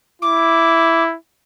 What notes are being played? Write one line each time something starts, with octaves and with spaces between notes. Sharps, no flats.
E4 D6